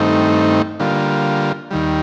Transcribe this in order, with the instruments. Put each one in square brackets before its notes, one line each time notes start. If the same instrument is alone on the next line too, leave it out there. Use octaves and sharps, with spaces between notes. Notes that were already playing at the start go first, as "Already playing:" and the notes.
Already playing: [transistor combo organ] G2 D#3 A3 C4 D#4
D3 G3 A#3 F4
D#2 D#3 G3